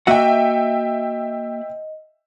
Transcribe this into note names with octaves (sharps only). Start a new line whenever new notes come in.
A#3 F#4 D#5 E5 F#5 G5